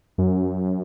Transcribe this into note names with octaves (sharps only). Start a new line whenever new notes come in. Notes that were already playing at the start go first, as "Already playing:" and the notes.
F#2